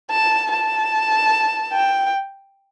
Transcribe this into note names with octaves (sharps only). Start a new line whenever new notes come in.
A5
A5
G5